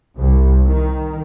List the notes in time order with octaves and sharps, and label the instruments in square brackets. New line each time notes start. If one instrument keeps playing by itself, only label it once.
[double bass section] C2
D#3